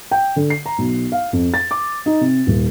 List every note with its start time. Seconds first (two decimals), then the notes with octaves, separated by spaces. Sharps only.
0.11 G5
0.36 D3
0.50 C7
0.66 A#5
0.78 B1
1.12 F5
1.33 F2
1.54 A6
1.71 D6
2.06 D#4
2.21 C3
2.47 D#1